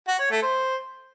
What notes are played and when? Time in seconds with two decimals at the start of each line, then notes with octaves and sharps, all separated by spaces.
0.08 F#4
0.19 C#5
0.31 A3
0.42 C5